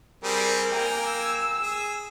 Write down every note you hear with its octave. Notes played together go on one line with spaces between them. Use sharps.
G3 C4 G#4 A#4
A#3 G5 G#5 A#5
E6
G#4